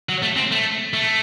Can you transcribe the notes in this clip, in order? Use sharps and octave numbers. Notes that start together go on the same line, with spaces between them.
F#3
A3
C4
A3
A3